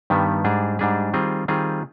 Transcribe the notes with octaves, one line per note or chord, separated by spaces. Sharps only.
G2 D#3 G3 B3
G#2 G3 D4 G#4
G#2 G3 D4 G#4
D#3 G3 C4 F4 G#4
D#3 G3 C4 F4 G#4